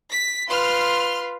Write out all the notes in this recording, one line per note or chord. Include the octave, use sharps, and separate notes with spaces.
B6
F4 B4 C6 F6